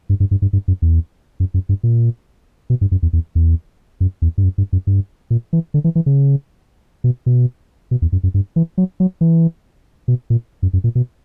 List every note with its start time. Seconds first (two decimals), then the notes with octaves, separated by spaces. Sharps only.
0.09 G2
0.20 G2
0.31 G2
0.42 G2
0.53 G2
0.68 F#2
0.82 E2
1.40 F#2
1.54 F#2
1.69 G2
1.83 A#2
2.70 B2
2.81 G2
2.91 F#2
3.03 E2
3.13 E2
3.35 E2
4.00 F#2
4.22 E2
4.38 G2
4.44 F#2
4.58 G2
4.73 F#2
4.87 G2
5.30 A#2
5.53 E3
5.74 D3
5.84 E3
5.95 E3
6.06 C#3
7.04 B2
7.26 B2
7.91 B2
8.02 E2
8.12 F#2
8.23 F#2
8.34 G2
8.56 E3
8.78 F#3
9.00 F#3
9.21 E3
10.08 B2
10.30 A#2
10.63 F#2
10.73 F#2
10.84 A#2
10.95 B2